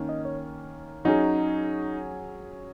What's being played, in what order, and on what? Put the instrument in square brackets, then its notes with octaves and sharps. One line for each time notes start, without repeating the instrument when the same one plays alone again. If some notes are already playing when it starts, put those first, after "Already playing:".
Already playing: [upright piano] D#3 A#3 C#4
[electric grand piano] D#5
C#5
[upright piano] F#3 C#4 G#4 [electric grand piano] D#4